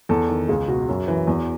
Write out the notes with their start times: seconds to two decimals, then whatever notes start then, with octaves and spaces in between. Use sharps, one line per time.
0.09 E2 A4
0.29 D#3
0.49 C#2 G#4
0.68 B2 F#4
0.88 F#2
1.08 E3
1.27 E2